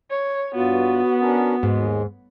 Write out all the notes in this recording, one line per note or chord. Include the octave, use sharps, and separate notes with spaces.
C#5
G2 B3 F4 F#4
C#4 D4 A#4
D#2 G#2 G#3